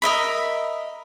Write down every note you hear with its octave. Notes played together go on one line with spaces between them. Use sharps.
A#4 D#5 E5 B5